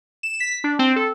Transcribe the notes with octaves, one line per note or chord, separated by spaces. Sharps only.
E7
B6
D4
C4
A4